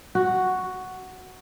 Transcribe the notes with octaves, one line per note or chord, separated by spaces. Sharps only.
F#4